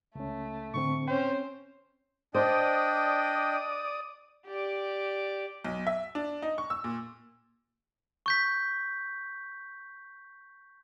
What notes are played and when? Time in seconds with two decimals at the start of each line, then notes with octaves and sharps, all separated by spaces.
0.15 C#2 A3 C#4
0.74 A2 D3 C4 C#6
1.08 C4 C#4 C5 G5
2.35 D4 C5 D5 D#5 G5 D#6
4.46 G4 D5
5.65 B1
5.87 E5
6.15 D4
6.42 D#4
6.58 C#6
6.70 E6
6.84 A#2
8.26 C#6 G6 B6